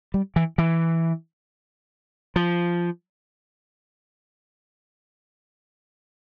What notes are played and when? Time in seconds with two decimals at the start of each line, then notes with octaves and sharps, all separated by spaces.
0.14 G3
0.36 E3
0.58 E3
2.36 F3